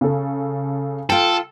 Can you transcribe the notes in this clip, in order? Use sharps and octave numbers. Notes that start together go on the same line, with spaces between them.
C#3 A4
F4 A4 G5